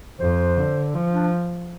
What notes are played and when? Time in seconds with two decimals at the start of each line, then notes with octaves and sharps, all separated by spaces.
0.20 F2 C5
0.57 D3
0.94 F3
1.13 D4